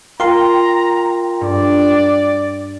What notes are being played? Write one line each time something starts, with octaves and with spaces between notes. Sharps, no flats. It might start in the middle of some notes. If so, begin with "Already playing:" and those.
F4 A#4 G5 A#5 C6
G2 D5